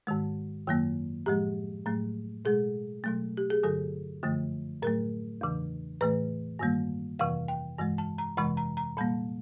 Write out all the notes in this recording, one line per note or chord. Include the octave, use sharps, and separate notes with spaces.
G#2 D#3 G#3
F#2 D#3 F#3 A#3
A2 F3 G#3 G4
A2 F#3 A3
B2 G#3 G#4
B2 F#3 A3
G4
G#4
G2 D3 F#3 A4
F#2 D3 F3 A3
A2 F#3 A3 A#4
E2 C#3 E3
A2 E3 A3 B4
G2 D#3 G3 A#3
F2 C3 E3 F5
G5
G2 E3 G#3
A5
A#5
F2 C3 E3 G#3 B5
A#5
A#5
A#2 G3 A#3 A5